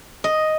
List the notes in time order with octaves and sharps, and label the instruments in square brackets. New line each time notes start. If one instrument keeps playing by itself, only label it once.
[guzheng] D#5